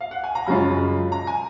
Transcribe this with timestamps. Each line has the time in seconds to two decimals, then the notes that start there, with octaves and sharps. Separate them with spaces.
0.01 F5
0.11 F#5
0.24 G#5
0.35 A#5
0.47 F#2 C#3 G#3 C#4 F4 B5
1.12 A#5
1.27 G#5